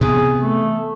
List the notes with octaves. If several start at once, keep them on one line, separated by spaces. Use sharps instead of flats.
C3 E3 B3 G#4
A3